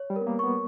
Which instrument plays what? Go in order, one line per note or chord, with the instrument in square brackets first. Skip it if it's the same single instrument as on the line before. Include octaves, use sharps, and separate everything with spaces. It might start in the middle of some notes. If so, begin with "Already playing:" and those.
Already playing: [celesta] C#5
[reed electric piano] G3
[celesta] A#4
[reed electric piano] B3
A#3
[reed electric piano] B3 [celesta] C#6